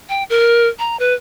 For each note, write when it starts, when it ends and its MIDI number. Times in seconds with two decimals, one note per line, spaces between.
0.09 0.23 79
0.30 0.67 70
0.79 0.97 82
0.99 1.14 71